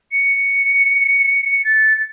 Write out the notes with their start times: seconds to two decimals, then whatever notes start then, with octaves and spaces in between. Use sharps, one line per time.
0.11 C#7
1.64 A6
1.97 A6